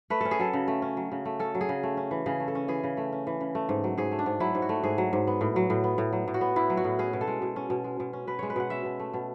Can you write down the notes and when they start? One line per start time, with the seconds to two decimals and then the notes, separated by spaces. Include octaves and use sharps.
0.10 A3 B4
0.21 C#4 A4
0.31 G#4
0.39 F#3 A4
0.53 C#3
0.68 A3
0.82 C#4
0.97 F#3
1.11 C#3
1.25 A3
1.39 C#4 A4
1.55 F#3
1.61 G#4
1.69 C#3
1.83 A3
1.97 C#4
2.11 E3
2.26 C#3 G#4
2.40 A3
2.48 A4
2.55 C#4
2.68 E3 G#4
2.84 C#3
2.97 A3
3.12 C#4
3.27 E3
3.41 C#3
3.55 A3
3.69 G#2
3.84 F#3
3.98 G#2 G#4
4.12 A3
4.19 D4
4.26 G#2
4.40 F#3 E4
4.55 G#2
4.62 F#4
4.69 A3
4.83 G#2 G#4
4.98 F#3
5.13 G#2
5.27 B3
5.41 A2
5.56 F#3
5.70 A2
5.84 B3
5.98 A2
6.13 F#3
6.28 A2
6.34 F#4
6.41 B3
6.56 A2 E4
6.70 F#3
6.77 F#4
6.84 A2
6.99 C#4 G#4
7.13 B2
7.21 A4
7.27 G#3
7.42 B2
7.56 C#4
7.70 B2
7.84 G#3
8.00 B2
8.13 C#4
8.27 B2 B4
8.39 G#3 C#5
8.50 B4
8.56 B2 F#5
8.70 C#4 E5
8.85 B2
8.99 A3
9.14 B2